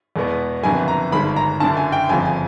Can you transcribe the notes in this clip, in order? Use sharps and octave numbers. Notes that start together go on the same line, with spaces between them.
E2 B2 G#3 B3
F#1 F2 D3 F#3 B3 G#5
A#5
G1 G2 D#3 G#3 B5
A#5
F#1 F#2 D3 A5
G#5
G5
G1 F2 C#3 F3 G#5
G#5